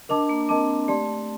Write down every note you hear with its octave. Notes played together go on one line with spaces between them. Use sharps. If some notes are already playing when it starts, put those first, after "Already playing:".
D4 A#4 D#5 A5 D6
A#3
C4 A#4 D#5 A5 D6
A3 G4 D5 A5 C6